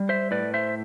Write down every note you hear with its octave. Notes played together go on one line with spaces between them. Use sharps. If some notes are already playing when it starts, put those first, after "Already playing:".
Already playing: G3
C5 E5
A2 B4 D5
C5 E5